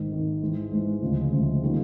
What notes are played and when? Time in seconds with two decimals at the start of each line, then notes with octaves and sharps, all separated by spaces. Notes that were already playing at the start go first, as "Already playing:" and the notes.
Already playing: G#1 G#2 D#3
0.11 G#1 G#2 D#3
0.42 G#2 E3 G#3
0.71 G#2 E3 G#3
1.02 D2 C#3 F3 G#3
1.31 D2 C#3 F3 G#3
1.63 D#3 G3 A#3